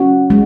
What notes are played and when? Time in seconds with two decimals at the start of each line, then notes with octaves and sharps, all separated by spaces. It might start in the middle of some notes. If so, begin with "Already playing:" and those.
Already playing: C#4 F#4
0.30 G#3